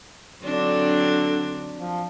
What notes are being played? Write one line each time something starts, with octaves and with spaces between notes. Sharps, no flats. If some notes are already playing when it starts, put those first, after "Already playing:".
D3 F#3 C4 D4
F3